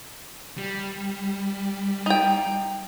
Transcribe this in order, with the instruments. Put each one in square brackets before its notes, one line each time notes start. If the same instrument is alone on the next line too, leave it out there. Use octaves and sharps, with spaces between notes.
[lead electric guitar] G3
[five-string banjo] D#4 G5